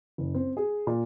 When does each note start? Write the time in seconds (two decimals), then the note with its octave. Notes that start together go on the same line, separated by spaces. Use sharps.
0.18 F#1
0.34 C4
0.57 G#4
0.87 A#2